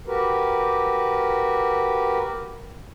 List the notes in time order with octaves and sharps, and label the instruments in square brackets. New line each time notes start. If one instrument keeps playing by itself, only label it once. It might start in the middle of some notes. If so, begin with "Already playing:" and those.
[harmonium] F#4 G4 A#4 B4